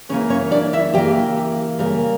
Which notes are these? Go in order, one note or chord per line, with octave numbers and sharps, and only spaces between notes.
C#3 E3 A#3 C#4 C#5
C#4 C#5
D4 D5
E4 E5
C#3 E3 A#3 G4 G5
C#3 G3 A#3